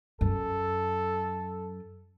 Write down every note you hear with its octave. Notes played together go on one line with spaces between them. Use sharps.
F#2 A4